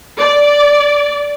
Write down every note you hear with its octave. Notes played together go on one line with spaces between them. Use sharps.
D5